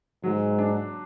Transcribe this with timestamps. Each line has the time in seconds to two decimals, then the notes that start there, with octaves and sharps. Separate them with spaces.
0.24 G#2 F#3
0.59 D4